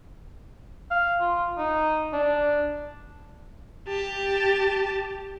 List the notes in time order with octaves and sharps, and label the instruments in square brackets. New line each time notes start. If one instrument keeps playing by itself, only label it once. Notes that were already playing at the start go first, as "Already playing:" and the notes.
[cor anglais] F5
F4
D#4
D4
[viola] G4 A5